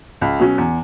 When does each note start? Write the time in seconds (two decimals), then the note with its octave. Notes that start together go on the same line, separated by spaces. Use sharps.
0.21 C#2
0.39 B2 F#3 C#4
0.58 E2